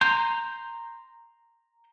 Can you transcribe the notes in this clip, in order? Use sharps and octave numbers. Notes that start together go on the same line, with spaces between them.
A#5 C6 G6